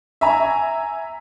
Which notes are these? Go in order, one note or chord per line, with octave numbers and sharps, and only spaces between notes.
E5 G#5 A#5